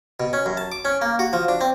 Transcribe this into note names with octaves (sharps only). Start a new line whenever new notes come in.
B2
C#4
F#2
A5
D6
C#4
A#3
F#4
F3
D4
C4